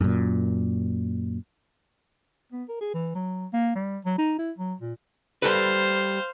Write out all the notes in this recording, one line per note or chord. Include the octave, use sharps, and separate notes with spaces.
F#2 A#2
B3
A#4
G#4
E3
F#3
A#3
G3
F#3
D#4
E4
F#3
A#2
G3 A4 B4 C5 F5